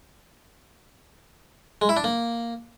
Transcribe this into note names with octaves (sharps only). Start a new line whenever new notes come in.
G#3
E4
D4
A#3